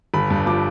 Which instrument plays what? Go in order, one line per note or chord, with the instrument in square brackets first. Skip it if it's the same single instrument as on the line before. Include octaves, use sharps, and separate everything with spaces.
[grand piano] G1 B5
G2
F3 D6